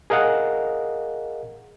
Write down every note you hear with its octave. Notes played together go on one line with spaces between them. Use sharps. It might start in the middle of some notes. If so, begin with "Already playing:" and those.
G#4 A#4 D#5 F5 F#5